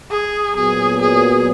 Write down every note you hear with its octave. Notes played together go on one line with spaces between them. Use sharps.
G#4
A#2 F#3 B3 G#4
G#4